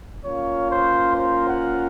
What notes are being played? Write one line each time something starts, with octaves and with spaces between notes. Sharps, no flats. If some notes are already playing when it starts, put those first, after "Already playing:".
A#3 C#4 F4 C#5
C5
C5
F#5